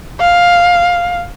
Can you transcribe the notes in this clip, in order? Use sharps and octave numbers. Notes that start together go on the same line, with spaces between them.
F5